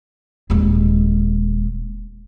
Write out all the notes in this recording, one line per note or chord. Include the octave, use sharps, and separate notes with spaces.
D#1 G#3